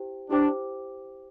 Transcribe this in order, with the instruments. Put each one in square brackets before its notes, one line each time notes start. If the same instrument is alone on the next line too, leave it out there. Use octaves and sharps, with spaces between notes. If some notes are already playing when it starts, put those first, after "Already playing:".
Already playing: [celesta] E4 G4 C5 G5
[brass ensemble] D4 [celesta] E4 G4 C5 G5 D6